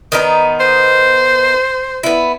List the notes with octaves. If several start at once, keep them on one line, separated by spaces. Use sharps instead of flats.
D#3 B3 D#4
C5
B3 E4